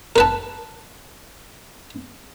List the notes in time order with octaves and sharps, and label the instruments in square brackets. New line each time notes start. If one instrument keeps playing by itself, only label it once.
[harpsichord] A#4 B4 A5